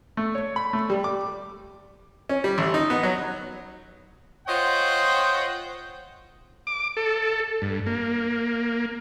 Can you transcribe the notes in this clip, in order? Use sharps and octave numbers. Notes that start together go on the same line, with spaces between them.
A3
C#5
B5
A3
G3
D6
C#4
G3
A1
D#4
B3
F#3
F4 C5 C#5 D#5 F#5 G5
D6
A4
G2
A#3